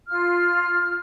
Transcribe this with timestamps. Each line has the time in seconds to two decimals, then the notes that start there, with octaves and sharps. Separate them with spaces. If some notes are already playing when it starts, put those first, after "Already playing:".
0.08 F4 F6